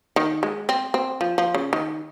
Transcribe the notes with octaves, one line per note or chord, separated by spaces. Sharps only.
D#3
G#3
C4
C4
F3
F3
C#3
D#3